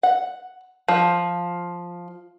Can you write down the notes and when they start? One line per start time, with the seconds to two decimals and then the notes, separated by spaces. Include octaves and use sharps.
0.03 F#5
0.88 F3